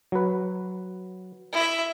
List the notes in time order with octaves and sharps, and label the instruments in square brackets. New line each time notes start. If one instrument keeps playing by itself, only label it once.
[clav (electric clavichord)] F#3 B4
[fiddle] E4 E5